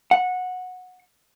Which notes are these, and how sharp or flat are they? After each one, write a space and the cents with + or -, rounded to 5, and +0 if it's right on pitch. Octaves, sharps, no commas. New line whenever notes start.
F#5 -15